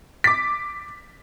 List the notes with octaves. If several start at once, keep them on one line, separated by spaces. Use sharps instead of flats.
D6 B6